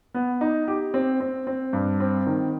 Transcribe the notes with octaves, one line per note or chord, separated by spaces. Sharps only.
B3
D#4
G4
C4
C4
C4
G2
C4
D#3